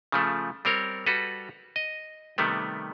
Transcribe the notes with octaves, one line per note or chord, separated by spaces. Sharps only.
C#3 F3 A3
G3 C4 A#4 C#5
G3 F#4 A4 B4
D#5
C3 D#3 G3 A3 B3